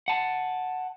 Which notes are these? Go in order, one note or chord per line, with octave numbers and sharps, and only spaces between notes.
F#5 A5